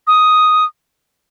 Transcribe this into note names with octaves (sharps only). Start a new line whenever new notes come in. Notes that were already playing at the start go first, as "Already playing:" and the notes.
D#6